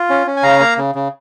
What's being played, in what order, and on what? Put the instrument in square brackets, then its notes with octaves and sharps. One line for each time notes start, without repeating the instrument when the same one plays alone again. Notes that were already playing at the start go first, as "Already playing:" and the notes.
Already playing: [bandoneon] F4
C#4
C#4
G#5
C#3 F5 A#5
A#3
C#3
C#3